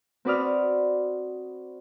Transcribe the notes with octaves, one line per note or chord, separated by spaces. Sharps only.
C4 F#4 B4 D5 D#6 F6